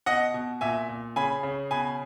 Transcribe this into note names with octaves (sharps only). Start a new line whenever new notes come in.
B2 D#5 F#5
B2
A#2 E5 G#5
A#2
C#3 G#5 B5
C#3
B2 G#5 B5